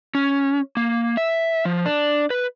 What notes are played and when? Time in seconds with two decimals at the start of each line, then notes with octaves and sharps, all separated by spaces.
0.15 C#4
0.77 A#3
1.17 E5
1.65 F3
1.86 D4
2.30 B4